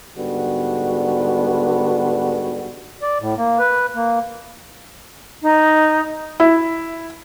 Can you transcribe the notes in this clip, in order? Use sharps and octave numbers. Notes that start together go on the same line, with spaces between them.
G#2 D3 G3 B3 F#4
D5
A2
A#3
B4
A#3
D#4
E4